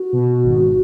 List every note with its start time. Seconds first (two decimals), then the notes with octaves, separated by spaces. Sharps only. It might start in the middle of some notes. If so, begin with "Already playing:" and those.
Already playing: F#4
0.13 B2
0.43 G#1